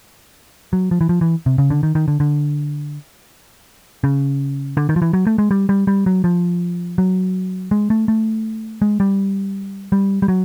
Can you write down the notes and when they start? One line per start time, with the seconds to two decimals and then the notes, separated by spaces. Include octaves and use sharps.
0.73 F#3
0.91 F3
1.01 E3
1.09 F3
1.21 E3
1.46 C3
1.58 C#3
1.70 D3
1.83 D#3
1.95 D#3
2.08 D3
2.20 D3
4.04 C#3
4.77 D3
4.89 D#3
4.96 F3
5.02 E3
5.13 F#3
5.27 A3
5.38 G#3
5.51 G3
5.69 G3
5.87 G3
6.06 F#3
6.24 F3
6.98 F#3
7.71 G#3
7.90 A3
8.08 A3
8.82 G#3
9.00 G3
9.92 G3
10.22 G3
10.28 F#3